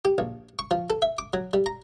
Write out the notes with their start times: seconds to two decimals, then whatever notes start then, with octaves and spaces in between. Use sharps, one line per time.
0.05 G4
0.18 A#1
0.59 C#6
0.71 F3
0.90 A4
1.02 E5
1.18 D6
1.33 F#3
1.53 G3
1.66 A#5